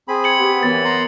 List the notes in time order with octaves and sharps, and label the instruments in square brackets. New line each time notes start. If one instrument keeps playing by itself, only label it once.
[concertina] C4 B5 [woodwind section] G#4
[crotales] G#6 C#7 F#7
[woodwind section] B3 [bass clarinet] G4
[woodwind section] F#2 E3 [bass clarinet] B3 [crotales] A6
[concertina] A#5 C6